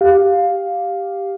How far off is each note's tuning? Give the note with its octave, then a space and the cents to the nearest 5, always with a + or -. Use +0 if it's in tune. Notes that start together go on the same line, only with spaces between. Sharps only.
G4 +0 F5 +10